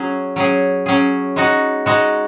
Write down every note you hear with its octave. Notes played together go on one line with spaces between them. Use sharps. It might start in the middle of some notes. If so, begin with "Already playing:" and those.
Already playing: F#3 C#4 G#4
F#3 C#4 G#4
F#3 C#4 G#4
G#3 D#4 F#4
G#3 D#4 F#4